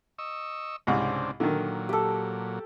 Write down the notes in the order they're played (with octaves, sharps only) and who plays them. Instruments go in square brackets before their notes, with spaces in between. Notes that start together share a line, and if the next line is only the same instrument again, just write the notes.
[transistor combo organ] D#5 C#6 E6
[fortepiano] C2 G#2 [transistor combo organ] C#3 C4 D4
[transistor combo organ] A#2 F#3 [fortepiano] D3 D#3
[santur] G4 A4